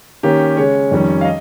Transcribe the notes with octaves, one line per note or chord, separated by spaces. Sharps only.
D#3 A#3 C#4 G4
C#3 G#3 C#4 C#5
F2 D#3 G3 C#4
F5
D#5